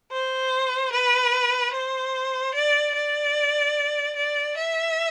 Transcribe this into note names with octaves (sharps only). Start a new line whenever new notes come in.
C5
B4
C5
D5
D5
D5
E5